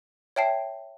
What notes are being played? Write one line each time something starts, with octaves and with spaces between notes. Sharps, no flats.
C#5 E5 G5 A5 C7